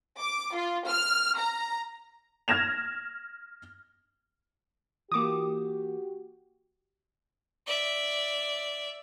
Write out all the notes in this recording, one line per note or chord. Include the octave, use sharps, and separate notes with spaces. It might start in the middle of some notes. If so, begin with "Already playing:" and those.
D6
F4
F6
A#5
F6 G#6 A#6 E7 F7
E3 A#3 F#4 G4 D6 D#6
D5 E5